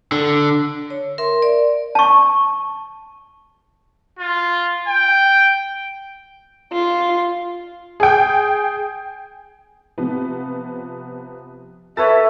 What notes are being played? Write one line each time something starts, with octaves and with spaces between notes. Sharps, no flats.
D3
C#5
A#4 E5 C6
D5
A5 C#6
F4
G5
F4
G#4 G5
C3 F3 B3
A4 B4 C#5 E5 A6